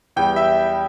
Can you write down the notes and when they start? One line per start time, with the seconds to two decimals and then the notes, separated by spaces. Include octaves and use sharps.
0.16 E2 E3 G3 G5
0.36 E5